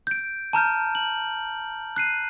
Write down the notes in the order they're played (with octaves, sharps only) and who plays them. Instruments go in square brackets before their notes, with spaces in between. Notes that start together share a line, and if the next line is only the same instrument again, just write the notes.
[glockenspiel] G6 D7
A5 A#5 F6 G6
F#7
F#6 C7 D#7